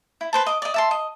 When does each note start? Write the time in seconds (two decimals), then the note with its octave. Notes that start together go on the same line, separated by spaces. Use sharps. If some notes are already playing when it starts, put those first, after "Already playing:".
0.21 E4
0.33 B4 C5 A5
0.46 D#5 D6
0.62 D5 D#5
0.74 E5 A5 C6
0.91 D#5